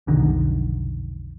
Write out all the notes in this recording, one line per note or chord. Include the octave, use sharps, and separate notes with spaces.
F1 B1 D3 D#3